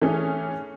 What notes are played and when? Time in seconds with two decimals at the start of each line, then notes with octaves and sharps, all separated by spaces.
0.02 E3 A3 C#4 G#4